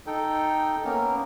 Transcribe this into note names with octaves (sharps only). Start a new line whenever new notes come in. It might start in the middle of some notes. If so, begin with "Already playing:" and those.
D#4 A4 G5
A#3 B3 C#4 A#4